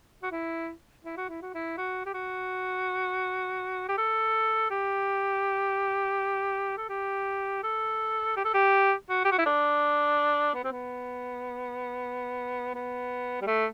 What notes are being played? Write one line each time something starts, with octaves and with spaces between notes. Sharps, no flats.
F#4
E4
E4
F#4
E4
F#4
E4
F#4
G4
F#4
G4
A4
G4
A4
G4
A4
G4
A4
G4
F#4
G4
F#4
E4
D4
B3
C4
B3
B3
G3
A3